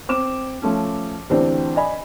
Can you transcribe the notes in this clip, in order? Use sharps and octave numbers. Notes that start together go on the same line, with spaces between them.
C4 D6 E7
F3 A3 C#4
D2 E3 C4 D4 G4 C5
D5 D#5 G#5 B5